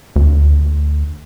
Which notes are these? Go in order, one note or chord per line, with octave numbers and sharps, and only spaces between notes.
D2